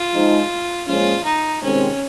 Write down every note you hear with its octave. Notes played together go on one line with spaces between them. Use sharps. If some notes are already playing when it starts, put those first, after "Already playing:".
Already playing: F4
F3 G#3 D#4
A#2 F3 G#3 C#4 F4
D#4
C3 D#3 G#3 C4 C#4